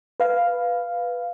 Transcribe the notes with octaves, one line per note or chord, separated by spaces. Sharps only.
B4 F5